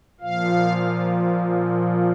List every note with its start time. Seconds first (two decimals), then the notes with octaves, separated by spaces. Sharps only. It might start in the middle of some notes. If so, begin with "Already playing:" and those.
0.20 A#2 F3 F5